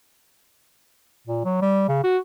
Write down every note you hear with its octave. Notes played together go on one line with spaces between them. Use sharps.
A#2
F#3
G3
C#3
F#4